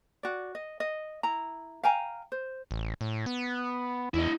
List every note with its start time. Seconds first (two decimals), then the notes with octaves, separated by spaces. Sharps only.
0.23 F#4 D5
0.55 D#5
0.80 D#5
1.23 E4 A#5
1.83 F5 G5 G#5 A#5
2.32 C5
2.71 A1
3.01 A2
3.26 B3
4.14 E2 E4 D#5